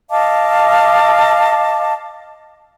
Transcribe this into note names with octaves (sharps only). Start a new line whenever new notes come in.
D#5 F5 A5 D6